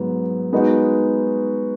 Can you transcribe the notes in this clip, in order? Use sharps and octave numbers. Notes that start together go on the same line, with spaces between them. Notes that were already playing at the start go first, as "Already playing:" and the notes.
Already playing: G#2 F#3 B3
G#3 B3 D#4 F#4